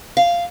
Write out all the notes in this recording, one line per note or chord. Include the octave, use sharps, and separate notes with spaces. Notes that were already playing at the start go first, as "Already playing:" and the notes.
F5